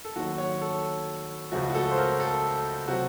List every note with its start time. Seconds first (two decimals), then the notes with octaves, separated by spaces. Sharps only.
0.05 A4
0.16 D#2 D#3 F#3 F#4
0.38 C#5
0.61 A4
1.52 C#2 C#3 F3 A3 F#4
1.70 F#4
1.75 A4
1.91 C5
1.98 A#4
2.20 A4
2.88 C3 F#3 C4 F#4